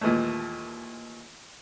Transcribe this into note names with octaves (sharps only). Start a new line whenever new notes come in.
D#2 A#2 E3 G#3 A3